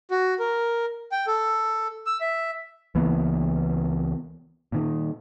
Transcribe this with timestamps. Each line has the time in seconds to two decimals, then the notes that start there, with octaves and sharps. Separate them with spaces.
0.11 F#4
0.39 A#4
1.12 G5
1.27 A4
2.06 E6
2.21 E5
2.95 C#2 E3 A#3 B3
4.72 A#2 D#3